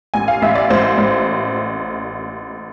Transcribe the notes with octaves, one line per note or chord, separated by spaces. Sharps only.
A1 G#5
F5
A1 E5
D5
A1 C5
A1